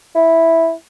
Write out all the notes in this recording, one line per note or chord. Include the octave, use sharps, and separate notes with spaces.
E4